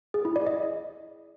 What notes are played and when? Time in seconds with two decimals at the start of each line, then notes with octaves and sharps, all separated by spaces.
0.14 G#4
0.25 E4
0.36 D5
0.47 D#5